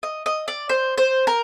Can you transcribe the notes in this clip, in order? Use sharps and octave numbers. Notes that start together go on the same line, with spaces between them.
D#5
D#5
D5
C5
C5
A#4